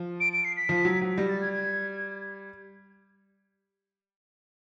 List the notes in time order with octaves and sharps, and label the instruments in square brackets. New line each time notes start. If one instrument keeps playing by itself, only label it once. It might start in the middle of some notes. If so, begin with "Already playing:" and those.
Already playing: [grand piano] F3
[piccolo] D7
D7
C7
B6
[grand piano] F3
F#3
F#3
[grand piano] G3 [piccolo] A#6
[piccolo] A6
G#6
G#6